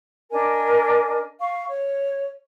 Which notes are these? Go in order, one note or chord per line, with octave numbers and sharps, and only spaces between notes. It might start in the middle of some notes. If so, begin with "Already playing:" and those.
D4 A#4 D#5 G#5
F5 C#6
C#5